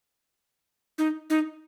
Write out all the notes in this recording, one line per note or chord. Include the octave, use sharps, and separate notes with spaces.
D#4
D#4